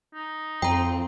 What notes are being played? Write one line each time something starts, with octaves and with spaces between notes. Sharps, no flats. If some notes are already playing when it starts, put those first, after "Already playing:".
D#4
F2 C4 G5 A#5